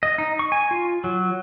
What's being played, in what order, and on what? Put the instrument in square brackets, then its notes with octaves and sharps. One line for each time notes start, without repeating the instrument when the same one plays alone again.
[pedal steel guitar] D#5
D#4
C#6
G#5
F4
F#3